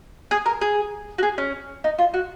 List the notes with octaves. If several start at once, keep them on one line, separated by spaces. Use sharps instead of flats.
G#4
A#4
G#4
F#4
G#4
C#4
D#4
F4
F#4